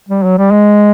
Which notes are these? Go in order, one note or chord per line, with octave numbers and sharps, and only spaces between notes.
G3
F#3
G3
G#3